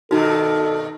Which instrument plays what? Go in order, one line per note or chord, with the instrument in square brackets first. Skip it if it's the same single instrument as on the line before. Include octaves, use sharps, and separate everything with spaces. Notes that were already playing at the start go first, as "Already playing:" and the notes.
[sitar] G2 B2 D#3 [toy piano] D#4 F#4 [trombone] A4